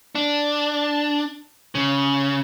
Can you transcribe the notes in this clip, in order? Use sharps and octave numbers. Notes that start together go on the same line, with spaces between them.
D4
C#3